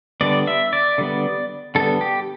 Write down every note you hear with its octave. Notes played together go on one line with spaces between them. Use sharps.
D3 G3 B3 D5
E5
D5
D3 G3 B3
D3 G3 B3 A4
G4